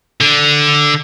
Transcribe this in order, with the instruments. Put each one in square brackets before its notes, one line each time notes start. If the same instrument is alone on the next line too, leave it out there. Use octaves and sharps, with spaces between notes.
[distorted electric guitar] D3